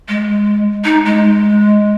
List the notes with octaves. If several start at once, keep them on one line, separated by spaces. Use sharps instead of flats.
G#3
D#4
G#3